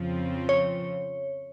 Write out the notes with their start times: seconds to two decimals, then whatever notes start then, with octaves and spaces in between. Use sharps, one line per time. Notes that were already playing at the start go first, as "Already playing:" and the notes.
Already playing: F2 C#3 F3 C4
0.49 C#5